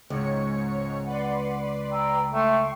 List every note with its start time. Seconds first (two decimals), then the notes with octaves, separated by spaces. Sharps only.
0.10 C#2 G#2 C#5 C#7
1.06 B4 D5 F#5 C6
1.92 G5 A#5 E6
2.34 A3 G5 C6 C#6